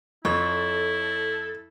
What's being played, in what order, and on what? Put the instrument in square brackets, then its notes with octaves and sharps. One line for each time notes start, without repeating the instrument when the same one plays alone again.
[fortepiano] F2 [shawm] E4 [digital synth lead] A4 [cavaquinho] C#5